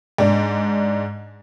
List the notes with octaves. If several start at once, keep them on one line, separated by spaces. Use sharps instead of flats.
G#2 D4